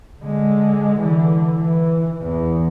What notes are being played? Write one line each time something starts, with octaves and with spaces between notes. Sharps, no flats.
D3 G#3
D3 E3
E3
E2